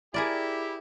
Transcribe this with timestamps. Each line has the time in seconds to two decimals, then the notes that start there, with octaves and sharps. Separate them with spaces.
0.14 E4 G4 G#4 A#4 D5